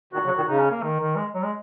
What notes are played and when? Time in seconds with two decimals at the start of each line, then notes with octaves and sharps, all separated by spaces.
0.13 A#2 D#3 F#4
0.25 C#3 F#3
0.36 A#2 D#3
0.48 C#3 D#4
0.59 C#4
0.71 A#3
0.83 D#3
1.00 D#3
1.17 G#3
1.35 F#3
1.43 G#3